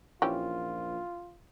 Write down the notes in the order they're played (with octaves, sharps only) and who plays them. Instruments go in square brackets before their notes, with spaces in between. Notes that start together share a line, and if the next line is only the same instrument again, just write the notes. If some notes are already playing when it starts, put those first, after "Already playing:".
[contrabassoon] A#1 [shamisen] E3 C#4 G4 [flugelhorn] F4